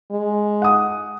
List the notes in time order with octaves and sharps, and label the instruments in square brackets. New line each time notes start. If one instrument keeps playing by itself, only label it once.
[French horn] G#3
[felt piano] F#5 D#6